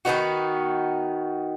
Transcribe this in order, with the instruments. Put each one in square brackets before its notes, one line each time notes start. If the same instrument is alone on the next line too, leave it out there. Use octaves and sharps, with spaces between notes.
[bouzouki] D#3 B3 D#4 F#4